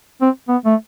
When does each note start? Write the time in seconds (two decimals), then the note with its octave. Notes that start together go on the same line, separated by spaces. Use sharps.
0.21 C4
0.49 B3
0.66 A3